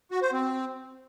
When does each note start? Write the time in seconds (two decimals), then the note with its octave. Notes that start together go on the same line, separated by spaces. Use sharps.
0.11 F#4
0.22 C5
0.33 C4